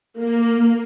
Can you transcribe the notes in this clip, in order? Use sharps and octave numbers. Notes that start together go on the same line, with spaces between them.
A#3